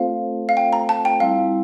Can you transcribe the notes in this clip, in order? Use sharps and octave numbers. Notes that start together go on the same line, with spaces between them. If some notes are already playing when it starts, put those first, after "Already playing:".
Already playing: A3 C4 F4 A4 C5 F5
F5
G5
A#5
A5
G5
G3 C4 E4 F5